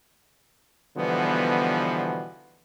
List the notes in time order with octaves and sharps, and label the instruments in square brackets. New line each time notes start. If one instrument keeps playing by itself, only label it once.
[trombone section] B2 D3 E3 F3 G3 B3